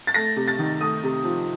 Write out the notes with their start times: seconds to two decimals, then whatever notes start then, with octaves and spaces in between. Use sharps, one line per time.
0.07 A6
0.14 A3 A#6
0.36 C3
0.48 A6
0.59 D#3
0.81 A3 D#6
1.03 C3
1.24 F3